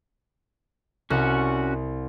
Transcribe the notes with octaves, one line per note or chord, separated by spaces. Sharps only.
C2 C#4 F#4 C#7